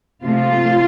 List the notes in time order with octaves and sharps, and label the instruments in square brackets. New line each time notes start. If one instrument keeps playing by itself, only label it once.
[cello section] C3 F3 A3 F4